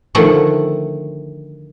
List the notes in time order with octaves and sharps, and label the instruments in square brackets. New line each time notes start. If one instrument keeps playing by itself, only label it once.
[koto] D3 D#3 F3 A3 F#5